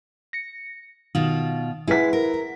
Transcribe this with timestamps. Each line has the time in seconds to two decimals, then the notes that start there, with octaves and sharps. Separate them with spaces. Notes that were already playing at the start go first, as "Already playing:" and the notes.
0.33 A#6 C#7
1.15 B2 D#3 F4
1.88 G#3 E4 B4 E5 F#5 B6
2.13 A#4